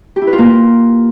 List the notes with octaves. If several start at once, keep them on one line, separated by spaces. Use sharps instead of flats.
G4
E4
B4
F4
A#3